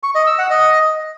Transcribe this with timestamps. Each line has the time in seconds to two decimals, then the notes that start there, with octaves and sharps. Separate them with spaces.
0.03 C#6
0.15 D#5
0.27 E6
0.38 F#5
0.50 D#5